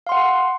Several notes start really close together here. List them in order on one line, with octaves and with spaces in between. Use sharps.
F5 C6 F#5